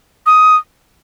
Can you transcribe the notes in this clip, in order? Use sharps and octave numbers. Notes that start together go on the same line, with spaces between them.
D#6